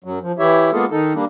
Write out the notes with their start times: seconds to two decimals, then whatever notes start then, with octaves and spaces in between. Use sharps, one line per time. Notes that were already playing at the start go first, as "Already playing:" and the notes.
0.04 F#2 F#3
0.22 F3
0.39 E3 E4 G4 C#5 E5
0.72 G#3 A#3 B3 F4 G#4 A4
0.91 D#3 D#4 A4
1.14 G3 A#3 D4